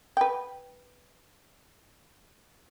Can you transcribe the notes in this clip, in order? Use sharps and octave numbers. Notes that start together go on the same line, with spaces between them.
B4 G5